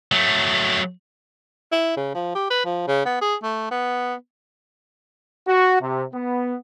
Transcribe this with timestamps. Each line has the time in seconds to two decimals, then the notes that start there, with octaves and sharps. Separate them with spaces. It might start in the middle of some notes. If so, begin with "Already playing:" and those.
0.12 F#3 A3
1.72 E4
1.97 C#3
2.14 F3
2.35 G4
2.50 B4
2.65 F3
2.88 C#3
3.06 B3
3.21 G#4
3.43 A3
3.71 B3
5.48 F#4
5.81 C3
6.14 B3